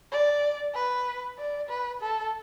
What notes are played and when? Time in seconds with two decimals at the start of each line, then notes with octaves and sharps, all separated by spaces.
0.12 D5
0.74 B4
1.38 D5
1.69 B4
2.01 A4